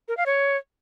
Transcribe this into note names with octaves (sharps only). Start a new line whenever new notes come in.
A#4
F5
C#5